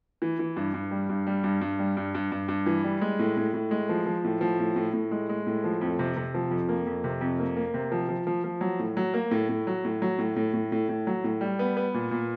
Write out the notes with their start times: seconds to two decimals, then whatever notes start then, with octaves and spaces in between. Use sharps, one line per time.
0.22 E3
0.39 E3
0.56 G2
0.74 G2
0.91 G3
1.09 G2
1.27 G3
1.44 G2
1.61 G2
1.79 G3
1.97 G2
2.15 G2
2.32 G2
2.48 G2
2.66 E3
2.84 G3
3.01 G#3
3.19 A2
3.37 A2
3.54 A2
3.71 G#3
3.89 F3
4.06 F3
4.24 A2
4.41 F3
4.59 A2
4.76 A2
4.93 A2
5.11 G#3
5.29 G#3
5.47 A2
5.64 F3
5.81 F2
5.99 C3
6.17 C3
6.34 F3
6.51 F2
6.69 A#3
6.87 F2
7.04 C3
7.21 F2
7.39 A#3
7.56 A#3
7.74 C3
7.92 F3
8.09 F3
8.27 F3
8.44 F3
8.61 F#3
8.79 A2
8.97 F#3
9.14 A#3
9.31 A2
9.49 A2
9.67 F#3
9.85 A2
10.02 F#3
10.18 A2
10.36 A2
10.53 A2
10.72 A2
10.89 A2
11.07 F#3
11.24 A2
11.41 G3
11.59 B3
11.77 B3
11.94 A#2
12.11 A#2